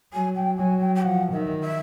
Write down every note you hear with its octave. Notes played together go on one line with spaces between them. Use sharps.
F#3 G#5
G5
F#3 G#5
G5
G5
F3 F#5
D#3 E5
E5